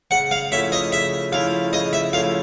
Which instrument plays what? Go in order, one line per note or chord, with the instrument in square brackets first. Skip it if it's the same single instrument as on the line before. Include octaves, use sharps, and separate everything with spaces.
[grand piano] C#3 [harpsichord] F#5
[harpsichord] F5
[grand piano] F3 A3 C#4 E4 [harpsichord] E5
[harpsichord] D#5
[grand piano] C#3 [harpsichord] E5
[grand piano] F3 A3 C#4 E4 [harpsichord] F5
[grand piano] C#3 [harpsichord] D#5
[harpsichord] E5
[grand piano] F3 A3 C#4 E4 [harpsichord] F5